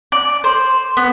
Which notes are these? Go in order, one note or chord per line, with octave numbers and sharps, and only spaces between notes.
D5
C5
B3